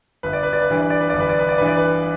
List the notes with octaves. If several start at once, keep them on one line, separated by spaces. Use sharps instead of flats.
G1 B4
D5
B4
D5
B4
G2 E3 D5
B4
D5
B4
G1 D5
B4
D5
B4
D5
G2 E3 B4
D5
B4